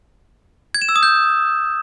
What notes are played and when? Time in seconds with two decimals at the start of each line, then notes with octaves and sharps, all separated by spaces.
0.74 G#6
0.82 E7
0.89 E6
0.96 D#6
1.03 G6